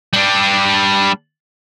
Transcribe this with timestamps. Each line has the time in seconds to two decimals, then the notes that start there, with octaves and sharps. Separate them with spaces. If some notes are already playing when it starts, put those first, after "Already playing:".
0.13 G3 D4